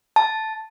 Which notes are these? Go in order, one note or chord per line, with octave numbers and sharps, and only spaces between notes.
A5